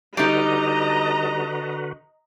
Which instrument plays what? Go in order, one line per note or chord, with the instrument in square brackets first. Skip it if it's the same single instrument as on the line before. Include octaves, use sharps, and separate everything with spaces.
[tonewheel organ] D3 F#4 B4 [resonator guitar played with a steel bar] G3 D#4 [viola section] D#5 A#5